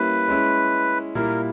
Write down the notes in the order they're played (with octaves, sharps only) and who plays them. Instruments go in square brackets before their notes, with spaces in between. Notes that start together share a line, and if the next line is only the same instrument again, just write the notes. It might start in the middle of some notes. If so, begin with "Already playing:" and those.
Already playing: [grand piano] G3 A#3 C#4 E4 [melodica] B4
[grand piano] G#3 C#4 E4
[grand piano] A#2 G3 A#3 E4 [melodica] A#4